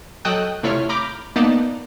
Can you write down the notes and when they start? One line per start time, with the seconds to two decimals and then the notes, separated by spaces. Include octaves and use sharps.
0.25 F#3 A4 D#5 G5 D#6 F#6
0.63 C3 A3 E4 F4 C#5 F6
0.89 A#5 B5 D6 F6 G6
1.36 A#3 B3 D#4 D5 A5